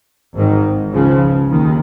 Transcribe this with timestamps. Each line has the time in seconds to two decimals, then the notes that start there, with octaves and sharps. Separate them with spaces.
0.34 G#1 G#2 D#3
0.93 C#2 C#3 F3
1.50 D#2 D#3